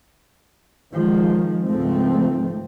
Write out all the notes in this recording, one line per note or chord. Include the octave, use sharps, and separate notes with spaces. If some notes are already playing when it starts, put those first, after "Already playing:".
D#3 F3 G#3
G#1 C#2 G#2 F3 A3 C4